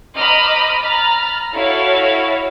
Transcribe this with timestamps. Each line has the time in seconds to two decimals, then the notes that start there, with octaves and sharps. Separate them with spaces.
0.16 C5 D#5 A#5 B5 D6 F6
0.81 A#5 B5 F6 A6
1.54 E4 F#4 A4 C#5 F5